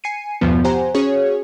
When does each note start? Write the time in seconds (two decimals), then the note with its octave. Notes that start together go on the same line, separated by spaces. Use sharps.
0.04 G#5 C7 C#7 D#7
0.41 E2 G2 B2 D3 F3 B3
0.64 G4 C5 F#5 G#5 A#5
0.95 C#4 F#4 G#4 C#5